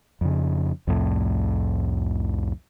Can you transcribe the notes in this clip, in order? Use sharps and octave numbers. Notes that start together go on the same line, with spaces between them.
F2 C#3
C2 F2 A2